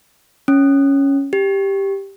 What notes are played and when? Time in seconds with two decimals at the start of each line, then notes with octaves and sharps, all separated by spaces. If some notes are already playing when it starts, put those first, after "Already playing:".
0.48 C#4
1.33 G4